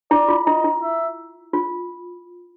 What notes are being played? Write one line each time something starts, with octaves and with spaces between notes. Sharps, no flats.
E4 D5
F4
E4 D#5
E4
E5
F4